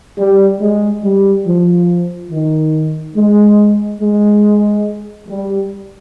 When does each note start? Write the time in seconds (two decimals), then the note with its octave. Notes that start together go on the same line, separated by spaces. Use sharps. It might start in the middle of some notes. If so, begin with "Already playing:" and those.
0.18 G3
0.61 G#3
1.03 G3
1.46 F3
2.30 D#3
3.16 G#3
4.01 G#3
5.28 G3